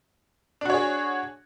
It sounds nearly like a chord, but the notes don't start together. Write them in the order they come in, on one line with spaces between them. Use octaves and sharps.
D4 F#4 C#5 G#4